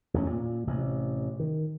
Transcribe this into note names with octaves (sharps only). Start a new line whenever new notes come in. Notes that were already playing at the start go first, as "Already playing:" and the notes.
A1 E2 A#3 C#4
A#2
A1 C3
D#3